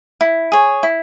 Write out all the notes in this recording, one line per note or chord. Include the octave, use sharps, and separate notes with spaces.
E4
G#4 C#5
E4